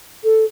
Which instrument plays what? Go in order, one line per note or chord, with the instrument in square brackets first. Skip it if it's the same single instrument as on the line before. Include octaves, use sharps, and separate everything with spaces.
[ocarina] A4